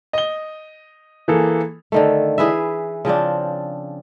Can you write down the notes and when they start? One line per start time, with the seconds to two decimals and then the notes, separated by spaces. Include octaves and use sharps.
0.13 D#5 G7
1.28 E3 A#3 G#4 A4
1.92 D3 D#3 A3
2.38 E3 G#4 B4 E5
3.05 C#3 F3 C4 D4